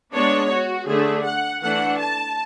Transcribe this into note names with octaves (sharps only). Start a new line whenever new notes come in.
G#3 B3 D4 C#5
F#4
D3 A3 D4 G#4
F#5
E3 A3 D4 F#5
A5